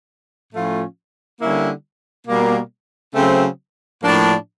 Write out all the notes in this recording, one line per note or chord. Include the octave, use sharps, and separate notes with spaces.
A2 F3 A3 C#4 F4
D3 G3 A#3 C#4 E4
B2 G3 A#3
C#3 F#3 A3 C4
A2 F3 A#3 D4